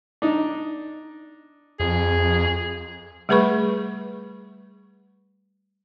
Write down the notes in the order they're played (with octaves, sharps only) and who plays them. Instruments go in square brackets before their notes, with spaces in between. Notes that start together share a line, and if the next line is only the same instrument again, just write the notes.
[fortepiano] D4 D#4
[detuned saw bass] F2 [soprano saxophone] G#4
[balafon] G3 A3 G#4 B4 B5 C#6